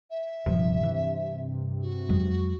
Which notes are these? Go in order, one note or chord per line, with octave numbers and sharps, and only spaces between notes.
E5
D#1 G2 C3 F3
E3
F#4
F2 F#3 G#3